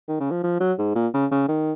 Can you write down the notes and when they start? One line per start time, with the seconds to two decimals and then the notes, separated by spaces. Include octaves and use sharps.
0.08 D#3
0.20 C#3
0.31 F3
0.43 F3
0.60 F#3
0.79 G#2
0.95 A#2
1.14 C#3
1.31 C#3
1.48 D#3